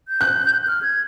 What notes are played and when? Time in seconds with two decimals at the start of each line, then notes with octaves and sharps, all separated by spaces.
0.08 G6
0.21 F#6
0.67 F6
0.83 G#6